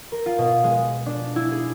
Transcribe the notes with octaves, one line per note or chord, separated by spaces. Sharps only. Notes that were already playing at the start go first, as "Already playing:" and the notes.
A#4
F4
B2
G#3
D4
E4
G#4